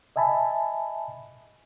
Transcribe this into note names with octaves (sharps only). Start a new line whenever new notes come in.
D#5 E5 G#5 A5 B5